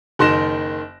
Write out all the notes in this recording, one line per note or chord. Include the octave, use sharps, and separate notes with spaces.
F#1 D#3 C6 F#6 A#6 E7